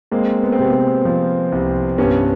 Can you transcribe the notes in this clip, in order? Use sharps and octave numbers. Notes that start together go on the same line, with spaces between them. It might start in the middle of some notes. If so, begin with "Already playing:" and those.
G#3 A#3 C4
B3
C4
C3 B3
B3
F3
C2
G2 B3 C#4